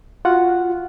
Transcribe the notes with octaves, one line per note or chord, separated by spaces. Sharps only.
F4 F#4 F#5